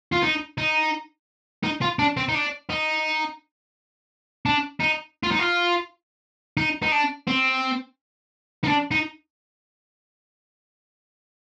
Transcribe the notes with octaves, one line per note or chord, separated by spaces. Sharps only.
F4
D#4
D#4
D#4
F4
D4
C4
D#4
D4
D#4
D4
D#4
F4
D#4
F4
D#4
D#4
D4
C4
D#4
D4
D#4